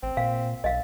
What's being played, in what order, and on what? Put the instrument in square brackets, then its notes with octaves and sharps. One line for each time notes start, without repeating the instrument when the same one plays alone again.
[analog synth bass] A1 [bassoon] C4
[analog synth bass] A#2 [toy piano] F5
[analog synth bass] B1 [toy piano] D#5 F5